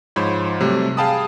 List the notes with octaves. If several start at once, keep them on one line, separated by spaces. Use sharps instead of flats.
G#2 F3 C5 C#5 B5
C3 F#3 G3 A3
G#4 F5 G5 A5 B5 D#6